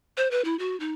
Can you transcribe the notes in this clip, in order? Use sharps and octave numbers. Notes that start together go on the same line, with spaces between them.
C5
B4
E4
F#4
D#4